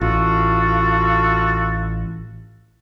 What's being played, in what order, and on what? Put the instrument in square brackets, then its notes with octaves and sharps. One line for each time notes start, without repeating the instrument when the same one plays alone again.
[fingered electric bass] A1 [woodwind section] F4 F#4 A4